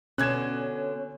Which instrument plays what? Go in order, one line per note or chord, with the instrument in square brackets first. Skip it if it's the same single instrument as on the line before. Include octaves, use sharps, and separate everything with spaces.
[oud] B2 D3 B3 [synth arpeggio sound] C#4 [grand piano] F#6 G#6 E7